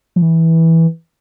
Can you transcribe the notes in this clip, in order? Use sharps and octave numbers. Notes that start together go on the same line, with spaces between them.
F3
E3